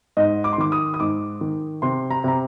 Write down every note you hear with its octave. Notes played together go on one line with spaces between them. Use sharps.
G#2 D#5
D6
C6
D#3 D6
D#6
D#6
G#2 D6
D#3
C3 C6
A#5
C3 A#5